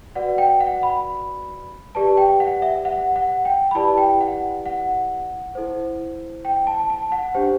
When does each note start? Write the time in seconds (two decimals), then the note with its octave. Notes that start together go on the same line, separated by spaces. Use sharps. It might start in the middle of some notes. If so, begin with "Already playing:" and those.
0.15 F#4 B4 D5 F#5
0.38 G5
0.60 F#5
0.83 B5
1.95 G4 B4 D5 A5
2.17 G5
2.40 F#5
2.62 E5
2.85 F#5
3.16 F#5
3.45 G5
3.71 B5
3.75 E4 G4 B4 D5 A5
3.97 G5
4.21 F#5
4.66 F#5
5.55 E4 A4 C5
6.45 G5
6.67 A5
6.90 A5
7.12 F#5
7.34 D4 G4 C5